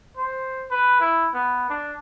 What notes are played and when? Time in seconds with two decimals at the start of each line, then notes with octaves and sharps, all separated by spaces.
0.17 C5
0.71 B4
1.01 E4
1.34 B3
1.70 D4